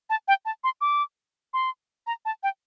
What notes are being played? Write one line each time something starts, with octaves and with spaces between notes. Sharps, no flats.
A5
G5
A5
C6
D6
C6
A#5
A5
G5